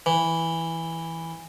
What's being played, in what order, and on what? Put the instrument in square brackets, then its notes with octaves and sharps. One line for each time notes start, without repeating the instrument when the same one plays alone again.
[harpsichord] E3